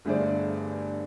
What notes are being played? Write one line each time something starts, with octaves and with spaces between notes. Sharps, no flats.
G1 G2 A3 G#4 C5 D5